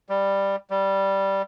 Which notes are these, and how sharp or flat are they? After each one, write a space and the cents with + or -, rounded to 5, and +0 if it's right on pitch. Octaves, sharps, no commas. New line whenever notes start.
G3 +10
G3 -5